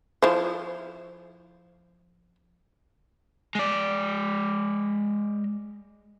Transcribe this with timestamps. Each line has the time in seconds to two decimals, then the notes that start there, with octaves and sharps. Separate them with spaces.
0.22 F3 E4 C5
3.55 G#3 D5